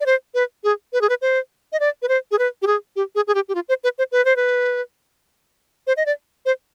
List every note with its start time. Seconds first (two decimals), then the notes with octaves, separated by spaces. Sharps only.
0.01 D5
0.06 C5
0.34 B4
0.64 G#4
0.93 B4
1.01 G#4
1.09 B4
1.22 C5
1.73 D#5
1.80 D5
2.02 B4
2.09 C5
2.31 G#4
2.39 B4
2.62 G4
2.67 G#4
2.96 G4
3.15 G#4
3.27 G#4
3.35 G4
3.49 G4
3.55 F4
3.69 C5
3.84 B4
3.98 C5
4.12 B4
4.25 C5
4.36 B4
5.87 C5
5.97 D#5
6.06 D5
6.46 C5